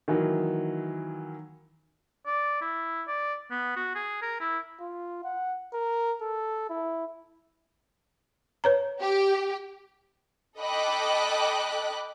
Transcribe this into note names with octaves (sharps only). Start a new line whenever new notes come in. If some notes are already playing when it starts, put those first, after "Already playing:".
D#3 E3 F#3 A#3
D5
E4
D5
B3
F#4
G#4
A#4
E4
F4
F#5
A#4
A4
E4
B4 C#5 A#5
G4
A4 D#5 G5 B5 D6 F#6